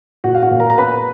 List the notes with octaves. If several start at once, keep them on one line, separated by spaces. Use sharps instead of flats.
A#2 F#4 F#5
F5
F#4 F#5
A#2
A#4 A#5
A#5
B3 B4 B5